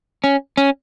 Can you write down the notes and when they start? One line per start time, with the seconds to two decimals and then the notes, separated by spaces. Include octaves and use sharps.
0.24 C#4
0.57 C#4